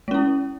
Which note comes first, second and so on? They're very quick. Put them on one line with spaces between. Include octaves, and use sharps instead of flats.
G#3 C#4 E4